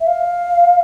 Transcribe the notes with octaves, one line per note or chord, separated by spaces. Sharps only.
E5
F5